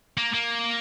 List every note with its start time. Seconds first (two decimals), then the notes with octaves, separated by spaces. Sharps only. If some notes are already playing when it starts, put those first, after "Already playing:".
0.17 A#3
0.34 A#3